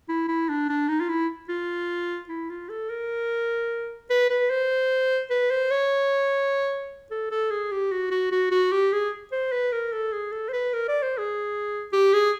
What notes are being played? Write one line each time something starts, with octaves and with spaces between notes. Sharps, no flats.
E4
E4
D4
D4
D#4
F4
E4
F4
E4
F4
A4
A#4
B4
B4
C5
B4
C5
C#5
A4
A4
G#4
G4
F#4
F#4
F#4
F#4
G4
G#4
C5
B4
A#4
A4
G#4
A4
C5
B4
A#4
D5
C5
G#4
G4
G#4